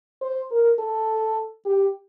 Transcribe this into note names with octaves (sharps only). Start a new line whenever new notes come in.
C5
A#4
A4
G4